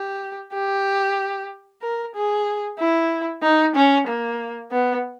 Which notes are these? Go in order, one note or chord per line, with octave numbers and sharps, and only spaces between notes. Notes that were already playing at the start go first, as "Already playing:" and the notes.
Already playing: G4
G4
A#4
G#4
E4
D#4
C#4
A#3
B3